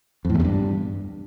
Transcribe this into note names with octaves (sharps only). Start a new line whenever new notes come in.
F2
A2
E2
C3
G2